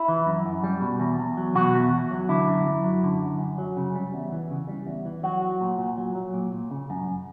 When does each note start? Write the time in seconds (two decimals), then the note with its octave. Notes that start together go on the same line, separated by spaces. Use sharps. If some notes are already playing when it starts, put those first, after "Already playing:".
Already playing: E4
0.08 E3
0.27 F#2
0.46 F#2
0.64 G3
0.82 B2
1.00 E2
1.19 E2
1.37 F#3
1.55 B2 F#4
1.74 E2
1.92 E2
2.11 F#3
2.29 D3 E4
2.48 F#2
2.67 F#2
2.84 F#3
3.03 D3
3.21 F#2
3.39 F#2
3.58 F#3
3.77 C#3
3.95 G3
4.14 E2
4.32 E3
4.51 C#3
4.69 G3
4.87 E2
5.05 E3
5.23 F#3 F#4
5.42 F#3
5.61 A#2
5.78 A#2
5.98 F#3
6.15 F#3
6.34 A#2
6.53 A#2
6.71 C#3
6.90 F#2